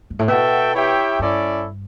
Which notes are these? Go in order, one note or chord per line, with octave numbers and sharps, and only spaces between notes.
G2
A2
B2 F#4 A4 E5 G5
E4 G4 C#5 E5 G5
G2 C#4 E4 A4 D5